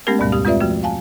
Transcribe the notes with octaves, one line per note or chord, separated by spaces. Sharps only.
G#3 A3 B3 C#4 G4 A#4
D2 G#2 B2 G3 B3
F2 G4 D#6
G#3 C4 F4 B4 D5 E5
F3 A3 F#4
F5 G#5 A5